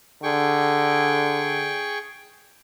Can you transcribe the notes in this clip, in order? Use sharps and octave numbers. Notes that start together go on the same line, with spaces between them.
D3 G#4 G5 C#6